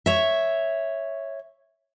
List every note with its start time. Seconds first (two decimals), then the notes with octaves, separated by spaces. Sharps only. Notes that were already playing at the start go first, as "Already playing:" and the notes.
0.06 C#5 E5